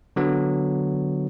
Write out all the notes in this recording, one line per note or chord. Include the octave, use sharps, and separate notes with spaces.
D3 F#3 B3